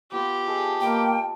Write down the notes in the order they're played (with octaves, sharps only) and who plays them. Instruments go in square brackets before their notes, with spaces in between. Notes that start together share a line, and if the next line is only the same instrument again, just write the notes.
[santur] B3 F4 B4 [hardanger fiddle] G4
[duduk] G#4 [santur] A4 D#5 G5
[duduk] A#3 [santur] D#5 A5 B5 [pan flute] G5